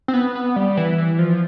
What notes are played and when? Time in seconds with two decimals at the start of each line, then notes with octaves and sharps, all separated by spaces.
0.08 C4
0.13 B3
0.35 B3
0.56 G3
0.77 E3
0.98 E3
1.19 F3